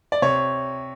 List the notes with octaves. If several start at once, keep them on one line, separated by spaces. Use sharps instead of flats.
D5
C3 C#5